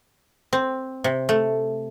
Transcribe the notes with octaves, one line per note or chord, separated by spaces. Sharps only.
C4
C3
A3